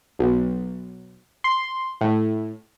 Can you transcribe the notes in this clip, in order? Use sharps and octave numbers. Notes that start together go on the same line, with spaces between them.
B1
C6
A2